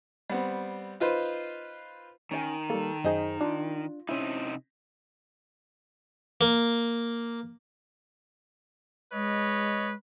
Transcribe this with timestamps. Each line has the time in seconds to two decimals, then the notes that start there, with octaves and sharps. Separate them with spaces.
0.30 G3 B3 C4
1.00 D#4 F4 B4 C5
2.31 D#3 C#4 D5 G#5
2.70 G3 A#3 A4
3.04 F#2 D#4 G#4 C5 D#5
3.41 D4 F4
4.09 C3 C4 C#4 D#4 E4
6.41 A#3
9.13 G#3 B4 C#5 D#5